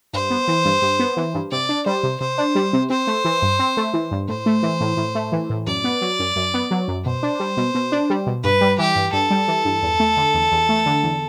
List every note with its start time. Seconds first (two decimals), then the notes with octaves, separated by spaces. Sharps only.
0.13 G2 C5
0.30 B3
0.48 E3
0.65 G2
0.82 G2
0.99 B3
1.17 E3
1.34 G2
1.51 C3 D5
1.69 D4
1.86 G3 C5
2.03 C3
2.20 C3 C5
2.38 D4
2.55 G3
2.73 C3
2.90 C4 C5
3.07 A3
3.25 E3
3.42 G2
3.59 C4
3.77 A3
3.93 E3
4.11 G2
4.29 A2 C5
4.46 A3
4.63 E3
4.81 A2
4.97 A2
5.15 A3
5.32 E3
5.50 A2
5.67 F#2 D5
5.84 B3
6.01 F#3
6.19 F#2
6.36 F#2
6.54 B3
6.71 F#3
6.88 F#2
7.05 B2 C5
7.23 D4
7.40 G3
7.57 B2
7.74 B2
7.92 D4
8.10 G3
8.27 B2
8.43 G2 B4
8.61 G3
8.78 E3 G4
8.96 G2
9.13 G2 A4
9.30 G3
9.48 E3
9.65 G2
9.82 E2
10.00 A3
10.17 D3
10.34 E2
10.52 E2
10.69 A3
10.86 D3
11.03 E2